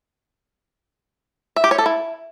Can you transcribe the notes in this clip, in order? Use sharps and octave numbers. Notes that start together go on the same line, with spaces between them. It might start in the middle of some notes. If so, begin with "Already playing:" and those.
E5
G4
C#5
A4
E4